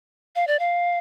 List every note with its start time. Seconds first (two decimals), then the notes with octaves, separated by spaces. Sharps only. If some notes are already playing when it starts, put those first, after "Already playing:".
0.36 F5
0.47 D5
0.59 F5